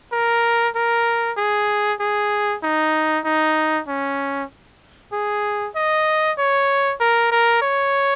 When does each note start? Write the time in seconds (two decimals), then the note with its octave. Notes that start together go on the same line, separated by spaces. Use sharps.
0.12 A#4
0.75 A#4
1.37 G#4
2.00 G#4
2.63 D#4
3.25 D#4
3.88 C#4
5.13 G#4
5.76 D#5
6.38 C#5
7.00 A#4
7.31 A#4
7.62 C#5